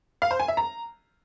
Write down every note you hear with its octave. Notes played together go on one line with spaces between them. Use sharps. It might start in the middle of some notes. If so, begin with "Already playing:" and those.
F5
C5
G#5
E5
A#5